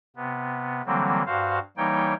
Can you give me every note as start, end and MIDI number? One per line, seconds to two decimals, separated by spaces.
0.16 0.82 48
0.16 0.82 59
0.86 1.23 50
0.86 1.23 52
0.86 1.23 54
0.86 1.23 55
0.86 1.23 58
0.86 1.23 60
1.26 1.59 43
1.26 1.59 66
1.26 1.59 72
1.26 1.59 77
1.77 2.14 52
1.77 2.14 55
1.77 2.14 58
1.77 2.14 63
1.77 2.14 73
1.77 2.14 79